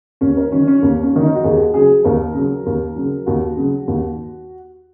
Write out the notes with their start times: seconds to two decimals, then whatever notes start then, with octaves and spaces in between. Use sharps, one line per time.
0.21 D#2 C#4
0.37 A#4
0.52 D#3 F#3 C#4
0.67 C#4
0.82 D#2 A#3
1.03 C#4
1.13 D#3 F#3
1.23 D#4
1.35 F#4
1.44 D#2 G#4
1.59 F#4
1.74 C#3 F#3 G#4
2.04 D#2 A#4
2.34 C#3 F#3
2.66 D#2
2.96 C#3 F#3
3.26 D#2 F#4
3.57 C#3 F#3
3.88 D#2